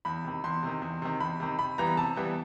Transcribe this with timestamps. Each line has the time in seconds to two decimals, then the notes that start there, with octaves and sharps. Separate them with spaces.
0.05 E2 B5
0.24 C3 D#3
0.44 E2 C6
0.63 C3 D#3
0.82 E2
1.02 C3 D#3
1.20 E2 B5
1.40 C3 D#3
1.58 C3 B5
1.78 E3 G3 B3 A#5
1.97 C3 A5
2.16 E3 G3 B3